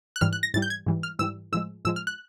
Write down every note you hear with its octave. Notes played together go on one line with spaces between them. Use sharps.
F#6
G#2 E3 G3 F6
F#6
A#6
G#2 E3 G3 A6
G6
G#6
G#2 E3 G3
F6
G#2 E3 G3 E6
A2 F3 G#3 E6
A2 F3 G#3 E6
F6
F#6